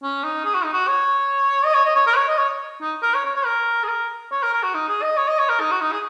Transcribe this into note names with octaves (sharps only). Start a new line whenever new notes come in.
C#4
D#4
G#4
F#4
D#4
F#4
C#5
D#5
C#5
D#5
C#5
A#4
C#5
D#5
C#5
D#4
A#4
C#5
C#5
C#5
A#4
G#4
A#4
C#5
A#4
A#4
F#4
D#4
G#4
D#5
C#5
D#5
C#5
A#4
D#4
F#4
D#4
G#4